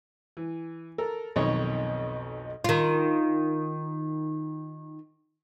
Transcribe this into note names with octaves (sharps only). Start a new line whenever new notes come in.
E3
A4 A#4
B1 F2 D#3 C#5 D#5
D#3 F4